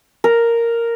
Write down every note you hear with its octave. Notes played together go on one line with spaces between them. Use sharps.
A#4